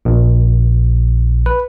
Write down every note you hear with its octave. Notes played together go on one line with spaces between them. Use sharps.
A#1
B4